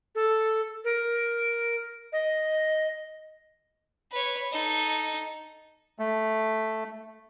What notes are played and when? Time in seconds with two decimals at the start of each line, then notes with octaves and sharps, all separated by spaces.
0.15 A4
0.84 A#4
2.13 D#5
4.12 B4 C#5
4.52 D#4 A4
5.99 A3